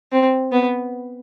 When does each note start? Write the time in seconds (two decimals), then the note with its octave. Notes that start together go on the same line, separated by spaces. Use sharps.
0.12 C4
0.52 B3